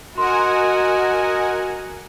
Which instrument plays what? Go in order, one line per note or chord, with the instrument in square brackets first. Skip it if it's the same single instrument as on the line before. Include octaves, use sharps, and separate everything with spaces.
[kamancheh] F#4 [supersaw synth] A#4 F#5 G#5 [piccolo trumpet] D#5 [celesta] C6